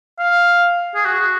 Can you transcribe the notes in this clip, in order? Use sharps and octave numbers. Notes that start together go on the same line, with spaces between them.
F5
G#4
F#4